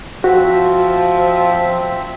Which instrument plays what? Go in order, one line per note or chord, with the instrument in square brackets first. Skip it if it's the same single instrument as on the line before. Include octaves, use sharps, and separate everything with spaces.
[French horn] F3 [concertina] C4 E5 [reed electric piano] F#4